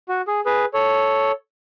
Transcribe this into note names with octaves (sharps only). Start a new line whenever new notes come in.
F#4
G#4
G#4 B4
A4 C#5